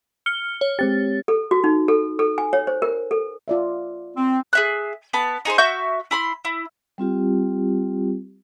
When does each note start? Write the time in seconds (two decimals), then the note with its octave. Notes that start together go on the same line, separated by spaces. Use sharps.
0.26 F6 C#7 G7
0.61 C#5
0.79 G#3 C4 G4 A6
1.28 A4
1.51 F#4
1.64 D#4
1.88 A4
2.19 A4
2.38 G#5
2.53 C#5
2.67 C5
2.82 A#4
3.11 A4
3.48 F4 D5 E5
4.16 C4
4.53 G#4 E5 F#6
5.13 B3 A5 B5
5.45 D#4 G#4 C5 C6
5.58 F#4 E5 C#6 G6
6.11 E4 B5 C6
6.45 E4
6.98 G3 C4 F4 G4